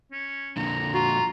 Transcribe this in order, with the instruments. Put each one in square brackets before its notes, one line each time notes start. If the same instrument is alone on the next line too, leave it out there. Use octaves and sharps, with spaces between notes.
[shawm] C#4
[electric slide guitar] F2 A#2 D3 [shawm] A#5
[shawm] F4 [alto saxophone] F#4 [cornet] A#5